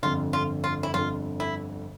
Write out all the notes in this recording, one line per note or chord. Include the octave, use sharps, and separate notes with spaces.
G1 F2 D3 F4
F4
F4
E4
G1 F2 D3 F4
E4